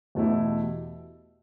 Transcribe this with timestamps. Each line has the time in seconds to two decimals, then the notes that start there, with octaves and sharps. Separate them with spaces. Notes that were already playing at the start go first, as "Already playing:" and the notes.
0.15 E2 B2 A3 E4 G4